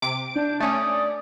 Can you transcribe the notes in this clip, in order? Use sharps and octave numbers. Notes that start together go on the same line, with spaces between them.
C3 D6 D7
D4 G6
A3 C#4 D5 D#6